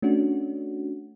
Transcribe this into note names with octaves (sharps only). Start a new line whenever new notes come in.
A3 C#4 D4 F#4